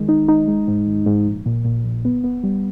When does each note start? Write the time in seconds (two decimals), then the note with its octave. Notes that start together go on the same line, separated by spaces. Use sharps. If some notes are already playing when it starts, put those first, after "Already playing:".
Already playing: D#3 G#3
0.09 D#4
0.28 D#4
0.48 G#3
0.68 G#2
0.87 G#1
1.06 G#2
1.27 A#1
1.46 A#2
1.65 A#2
1.84 A#1
2.05 B3
2.24 B3
2.43 G3